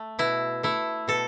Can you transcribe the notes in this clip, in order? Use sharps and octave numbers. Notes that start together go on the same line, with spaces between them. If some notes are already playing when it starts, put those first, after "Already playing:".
Already playing: A3
B2 E4
A3 E4
B2 A4